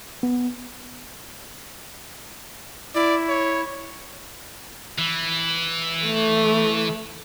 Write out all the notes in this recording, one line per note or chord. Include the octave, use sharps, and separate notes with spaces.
B3
E4 D5
C#5
E3
A3